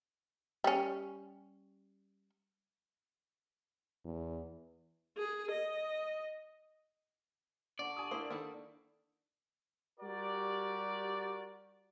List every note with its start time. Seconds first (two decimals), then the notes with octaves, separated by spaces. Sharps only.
0.64 G3 C#4
4.05 E2
5.18 G#4
5.51 D#5
7.79 D3 D5 C#6
7.96 G#5 D#6
8.11 A#3 E4 C5
8.30 D#3 A#3 E4 A4
10.00 G3 F#4 G4 A#4 D5